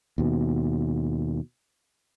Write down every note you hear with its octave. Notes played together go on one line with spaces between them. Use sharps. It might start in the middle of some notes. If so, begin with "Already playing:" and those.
D#2 B2